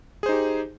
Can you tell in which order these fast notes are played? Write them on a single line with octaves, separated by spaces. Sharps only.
G#4 C5 D#4 G4